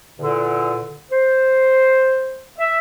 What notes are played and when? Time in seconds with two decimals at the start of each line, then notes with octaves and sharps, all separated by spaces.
0.19 E2 A#2 D3
1.12 C5
2.59 E5